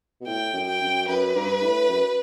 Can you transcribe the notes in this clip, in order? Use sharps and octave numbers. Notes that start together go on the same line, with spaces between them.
B2
A2 G5
F#2
G5
F#2
F#2 B4
G2
A2
F#2